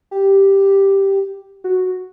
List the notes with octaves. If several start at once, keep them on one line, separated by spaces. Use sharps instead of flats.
G4
F#4